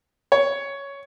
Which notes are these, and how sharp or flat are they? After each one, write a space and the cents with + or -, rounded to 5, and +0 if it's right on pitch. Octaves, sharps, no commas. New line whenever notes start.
C#5 +10